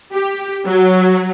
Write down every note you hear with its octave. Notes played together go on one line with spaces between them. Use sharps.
G4
F#3